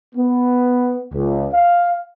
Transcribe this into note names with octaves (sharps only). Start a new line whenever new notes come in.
B3
C#2
F5